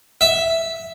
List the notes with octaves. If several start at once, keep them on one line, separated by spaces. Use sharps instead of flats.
E5